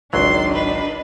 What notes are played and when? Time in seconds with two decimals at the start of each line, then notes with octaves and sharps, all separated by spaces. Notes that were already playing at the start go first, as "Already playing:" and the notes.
0.13 G#1 C#2 F#3 D4 D#4 C6
0.54 B4